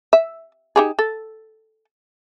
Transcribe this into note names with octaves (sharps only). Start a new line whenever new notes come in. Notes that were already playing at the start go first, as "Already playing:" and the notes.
E5
D#4 G4 G#4
A4